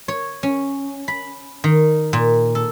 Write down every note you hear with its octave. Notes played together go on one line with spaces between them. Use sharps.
C#5
C#4
B5
D#3
A#2
A4